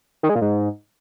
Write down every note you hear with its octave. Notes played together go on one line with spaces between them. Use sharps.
D#3
G#3
A#2
G#2